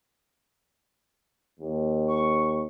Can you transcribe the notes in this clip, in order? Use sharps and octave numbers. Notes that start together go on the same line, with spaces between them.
D#2
C#6